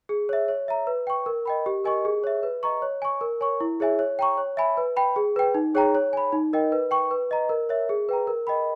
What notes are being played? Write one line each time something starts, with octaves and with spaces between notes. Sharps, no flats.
G#4
C#5 E5
C#5
E5 A#5
B4
G5 C#6
A#4
D#5 G5 B5
G4
A#4 D#5 G#5 C#6
G#4
C#5 E5
B4
D#5 A#5 C#6
C#5
G#5 C#6
A#4
C#5 G#5 C#6
E4
G#4 C#5 E5 G#5
C#5
G5 A#5 C#6
C#5
E5 G#5 B5
B4
G5 B5
G#4
B4 G5
D#4
G#4 C#5 G5 A#5
C#5
G#5 B5
D#4
A#4 D#5 G5
B4
G5 C#6
B4
D#5 A#5
A#4
C#5 E5
G#4
B4 G5 A#5
A#4
D#5 G5 B5